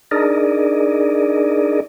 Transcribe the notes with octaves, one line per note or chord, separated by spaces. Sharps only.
D4 D#4 G#4 A#4 D5 D#5